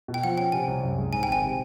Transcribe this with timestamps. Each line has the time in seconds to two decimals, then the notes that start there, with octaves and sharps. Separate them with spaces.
0.08 B2
0.14 G5
0.23 F3 F#5
0.37 C#4 G5
0.52 C3 G#5
0.67 C2
0.83 F#2
0.98 G#3
1.12 G#2 G#5
1.23 G5
1.28 G#1 G#5
1.43 C3